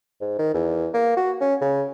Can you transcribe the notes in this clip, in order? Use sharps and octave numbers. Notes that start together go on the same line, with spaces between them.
G#2
D#3
E2
A#3
F#4
C#4
C#3